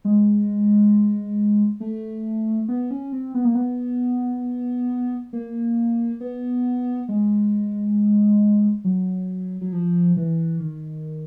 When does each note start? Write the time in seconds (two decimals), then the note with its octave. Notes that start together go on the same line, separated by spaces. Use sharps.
0.05 G#3
1.80 A3
2.68 B3
2.91 C#4
3.13 C4
3.34 B3
3.45 A#3
3.55 B3
5.33 A#3
6.20 B3
7.09 G#3
8.84 F#3
9.61 F#3
9.73 F3
10.17 E3
10.60 D#3